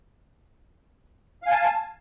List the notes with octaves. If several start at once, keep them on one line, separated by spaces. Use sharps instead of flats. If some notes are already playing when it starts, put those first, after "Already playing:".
F5 G#5 A5